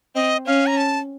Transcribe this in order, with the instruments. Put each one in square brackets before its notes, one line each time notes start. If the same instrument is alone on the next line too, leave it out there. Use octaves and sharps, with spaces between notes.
[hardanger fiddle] C4 [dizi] D#5
[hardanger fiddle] C#4 [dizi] F5
[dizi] A#5
A5